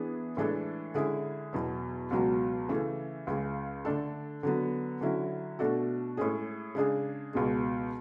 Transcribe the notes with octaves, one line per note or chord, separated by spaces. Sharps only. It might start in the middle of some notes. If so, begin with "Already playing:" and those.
Already playing: E3 B3 D4 G#4
A2 E3 G#3 D4 A4
D3 G#3 C#4 E4 G#4
E2 B2 F#3
C#2 B2 F#3
C#3 E3 A3
C#2 C#3 G#3
D3 A3 D4 A4
D3 F#3 B3
D3 F#3 C#4 E4
B2 A3 D4 F#4 A4
A2 G#3 C#4 G#4
C#3 G#3 D4 G#4
C#2 B2 G#3